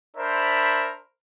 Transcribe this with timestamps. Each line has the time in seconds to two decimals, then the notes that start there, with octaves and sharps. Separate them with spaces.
0.17 D4 A#4 C5 E5 B5